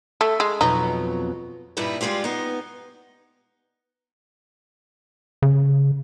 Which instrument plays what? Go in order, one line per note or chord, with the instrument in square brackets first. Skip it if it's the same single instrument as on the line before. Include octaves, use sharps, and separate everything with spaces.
[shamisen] A3
G#3
[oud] F2 B2 F#3 [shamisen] D#4
[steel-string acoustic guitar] G2 A#2 G3 D#4 E4 B4
G3 G#3 C#4 F4 G4
B3 D#4
[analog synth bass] C#3